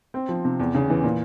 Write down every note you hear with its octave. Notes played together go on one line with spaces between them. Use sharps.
C4
F3
C3
E2
C#3
E3
A#2